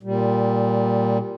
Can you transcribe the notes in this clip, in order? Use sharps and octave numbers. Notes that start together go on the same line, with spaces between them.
A#2 G3